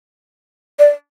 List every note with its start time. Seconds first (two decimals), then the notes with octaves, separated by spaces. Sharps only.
0.79 D5